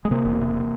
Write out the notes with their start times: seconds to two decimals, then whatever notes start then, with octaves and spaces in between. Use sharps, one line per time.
0.05 G#3
0.11 C3 A#3
0.25 E1
0.41 C3